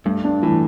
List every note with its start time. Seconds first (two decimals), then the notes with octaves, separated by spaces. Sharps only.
0.05 G2 A3
0.24 D4
0.43 A2 E3